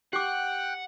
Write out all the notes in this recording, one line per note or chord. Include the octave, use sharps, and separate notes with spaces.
G4 F#5 G5 D6 F#6